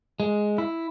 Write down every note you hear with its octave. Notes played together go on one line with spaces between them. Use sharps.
G#3
E4